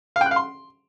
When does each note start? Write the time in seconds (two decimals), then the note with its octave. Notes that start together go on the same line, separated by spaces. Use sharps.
0.16 F5
0.21 G5
0.26 F#6
0.31 F5
0.36 C6